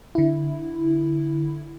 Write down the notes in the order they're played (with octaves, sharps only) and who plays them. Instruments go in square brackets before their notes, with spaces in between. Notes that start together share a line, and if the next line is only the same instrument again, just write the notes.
[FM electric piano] D3 E4